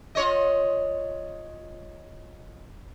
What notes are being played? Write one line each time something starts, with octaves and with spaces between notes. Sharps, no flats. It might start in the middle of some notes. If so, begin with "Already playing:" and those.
F4 C#5 D#5